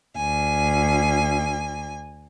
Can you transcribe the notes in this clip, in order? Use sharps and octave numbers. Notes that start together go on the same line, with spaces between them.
D2 G#5